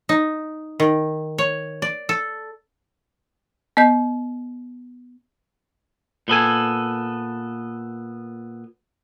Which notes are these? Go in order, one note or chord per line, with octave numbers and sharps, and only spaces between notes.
D#4
D#3
C#5
D5
A4
B3 D#5 G6
A#2 B3 A4 G#5